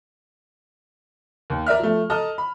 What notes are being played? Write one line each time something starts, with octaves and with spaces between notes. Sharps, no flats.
D#2
A#4 D5 E5 F6
F3 A3
A4 D#5 A5 A#5 D#6 F6
B5